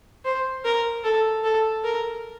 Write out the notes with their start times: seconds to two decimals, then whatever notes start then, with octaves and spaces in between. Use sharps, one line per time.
0.25 C5
0.65 A#4
1.04 A4
1.44 A4
1.84 A#4